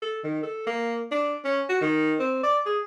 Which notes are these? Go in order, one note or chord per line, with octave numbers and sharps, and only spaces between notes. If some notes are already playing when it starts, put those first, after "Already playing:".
A4
D#3
A4
A#3
D4
C#4
F#4
D#3
C4
D5
G#4